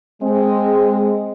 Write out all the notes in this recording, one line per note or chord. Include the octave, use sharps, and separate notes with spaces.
G#3 C4